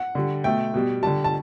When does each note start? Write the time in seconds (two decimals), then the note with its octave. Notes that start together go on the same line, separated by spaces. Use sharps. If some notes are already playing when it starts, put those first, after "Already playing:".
Already playing: F#5
0.15 D3 G3
0.44 B2 A3 G5
0.74 B2 G3
1.03 D3 G3 A5
1.24 A5